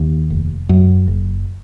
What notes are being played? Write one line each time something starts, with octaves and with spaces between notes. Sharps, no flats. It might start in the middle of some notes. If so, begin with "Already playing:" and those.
Already playing: D#2
F1
F#2
F#1